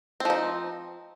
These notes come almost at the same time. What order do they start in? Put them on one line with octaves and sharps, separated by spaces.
C4 F3 D#4